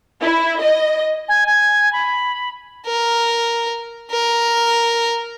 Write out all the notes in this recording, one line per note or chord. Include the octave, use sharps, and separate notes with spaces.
E4
D#5
G#5
G#5
B5
A#4
A#4